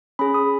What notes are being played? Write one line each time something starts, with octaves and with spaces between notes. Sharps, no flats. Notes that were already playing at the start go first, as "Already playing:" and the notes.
C#4 G#4 B5
D#6